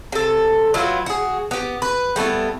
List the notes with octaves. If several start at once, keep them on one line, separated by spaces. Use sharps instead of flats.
C3 A4
F#3 B3 E4 F4
F#4 G#4
B3 G4
B4
G3 A3 B3 E4